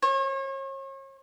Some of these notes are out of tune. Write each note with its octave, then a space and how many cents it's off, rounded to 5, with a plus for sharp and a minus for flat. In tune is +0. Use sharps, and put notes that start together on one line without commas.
C#5 -40